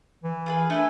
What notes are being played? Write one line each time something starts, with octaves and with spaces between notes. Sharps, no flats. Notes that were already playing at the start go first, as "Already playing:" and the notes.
E3
F4 G#4 B4
A3 D4 B4 G#5